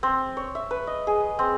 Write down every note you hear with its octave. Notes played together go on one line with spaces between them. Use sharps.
C4
C#5
E5
B4
D#5
G#4
C4